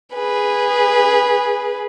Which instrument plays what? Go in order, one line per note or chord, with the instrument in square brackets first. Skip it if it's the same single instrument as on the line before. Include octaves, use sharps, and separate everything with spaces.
[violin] G#4 B4